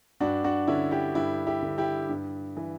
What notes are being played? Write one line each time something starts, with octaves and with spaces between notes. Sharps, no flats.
G2 D4 F#4
D4 F#4
D3 C#4 E4
E4 G4
G2 E4 G4
E4 G4
D3
E4 G4
G2
E3